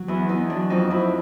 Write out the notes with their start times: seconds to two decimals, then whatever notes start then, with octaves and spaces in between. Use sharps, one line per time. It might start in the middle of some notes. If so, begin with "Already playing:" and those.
Already playing: F#3
0.08 E2 E4
0.29 E2 D#4
0.50 F#3 D4
0.70 F2 D#4
0.90 F2 E4